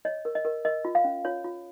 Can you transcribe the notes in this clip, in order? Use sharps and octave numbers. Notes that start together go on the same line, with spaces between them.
C#5 D#5
A#4
D#5
A#4
A#4 D#5
F4
F5
C#4
F4 C#5
F4